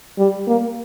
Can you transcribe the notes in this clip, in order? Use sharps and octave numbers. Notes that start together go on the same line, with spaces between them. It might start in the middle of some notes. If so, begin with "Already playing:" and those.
G3
A#3